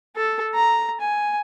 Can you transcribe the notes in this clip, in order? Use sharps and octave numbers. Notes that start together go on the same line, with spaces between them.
A4
A#5
G#5